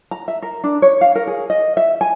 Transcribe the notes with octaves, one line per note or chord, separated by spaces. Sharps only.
A#5
E5
A#4
D4
C#5
F5
A#4
G#4
D#5
E5
G#5